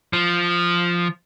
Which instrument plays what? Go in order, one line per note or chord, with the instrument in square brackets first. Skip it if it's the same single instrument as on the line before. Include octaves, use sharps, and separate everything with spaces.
[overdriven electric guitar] F3